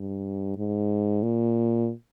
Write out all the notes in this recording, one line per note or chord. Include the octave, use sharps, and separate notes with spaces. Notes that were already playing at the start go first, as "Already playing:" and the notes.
Already playing: G2
G#2
A#2